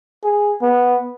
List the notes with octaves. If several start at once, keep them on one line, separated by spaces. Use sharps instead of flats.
G#4
B3